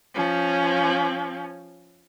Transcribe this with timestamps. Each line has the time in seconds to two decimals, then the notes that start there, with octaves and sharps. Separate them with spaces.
0.15 F3 C#4